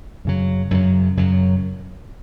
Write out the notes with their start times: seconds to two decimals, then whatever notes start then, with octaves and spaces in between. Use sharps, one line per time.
0.25 F#2 C#3 F#3
0.71 F#2 C#3 F#3
1.17 F#2 C#3 F#3